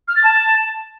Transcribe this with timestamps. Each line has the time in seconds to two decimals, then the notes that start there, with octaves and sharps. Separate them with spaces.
0.08 F6
0.16 A6
0.24 A5